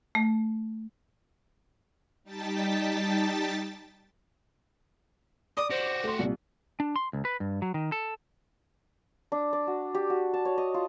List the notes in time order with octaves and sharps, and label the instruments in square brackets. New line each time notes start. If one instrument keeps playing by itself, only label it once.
[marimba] A3
[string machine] G3 D#4 G5 A5 A6 B6
[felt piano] D5 D6 [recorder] D#6
[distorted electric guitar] F#4 G4 [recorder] C5
[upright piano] A3 C6
C2 A#2
[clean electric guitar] D4
C6
C#2
B4
G2
F#3
D#3
A4
[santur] D4
D5
F#4
G4
F#4
A5
C#5
D#5
F4